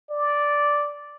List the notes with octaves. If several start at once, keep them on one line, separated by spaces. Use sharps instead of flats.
D5